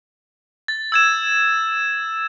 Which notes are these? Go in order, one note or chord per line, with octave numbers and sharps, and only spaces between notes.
A6
E6 G#6 E7